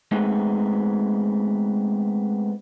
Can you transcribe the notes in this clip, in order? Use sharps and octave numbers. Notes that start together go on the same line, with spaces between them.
G#3 A3 B3 C4 D#4 G#4